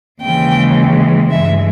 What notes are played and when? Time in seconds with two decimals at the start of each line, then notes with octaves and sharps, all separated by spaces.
0.22 D#2 C#3 E3 G#3 G5
1.30 G2 E3 G#3 E5